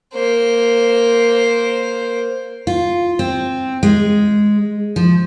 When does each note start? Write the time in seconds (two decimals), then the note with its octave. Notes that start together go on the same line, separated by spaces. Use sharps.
0.13 A#3 C5
2.67 F4
3.19 C4
3.83 G#3
4.96 F3